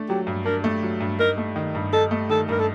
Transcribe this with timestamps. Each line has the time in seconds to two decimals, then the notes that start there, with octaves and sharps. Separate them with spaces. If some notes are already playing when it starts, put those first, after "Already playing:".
Already playing: A3 D4
0.09 F#3 G4
0.27 G2
0.46 D4 A#4
0.64 A3
0.83 F#3
1.01 G2
1.19 D#4 A#4
1.37 A3
1.56 D#3
1.75 G2
1.93 D#4 A4
2.11 A3
2.29 D#3 A4
2.49 G2 A#4
2.59 A4